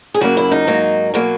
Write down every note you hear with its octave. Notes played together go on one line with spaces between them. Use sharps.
G#4
F#2 C#3 F#3 A#3 F#4
E4
D#4
G#2 F#3 A#3
B2 F#3 A#3